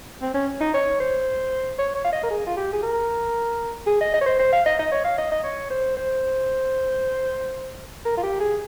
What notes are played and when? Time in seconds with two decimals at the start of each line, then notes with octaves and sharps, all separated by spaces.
0.22 C4
0.34 C#4
0.60 D#4
0.74 C#5
1.00 C5
1.78 C#5
1.95 C#5
2.04 F5
2.12 D#5
2.23 A#4
2.30 G#4
2.46 F4
2.57 G4
2.73 G#4
2.83 A#4
3.86 G#4
4.00 D#5
4.14 D#5
4.21 C#5
4.26 C5
4.39 C5
4.52 F5
4.66 D#5
4.79 D#5
4.92 C#5
5.04 F5
5.18 D#5
5.31 D#5
5.43 C#5
5.70 C5
5.96 C5
8.05 A#4
8.17 F4
8.23 G4
8.40 G#4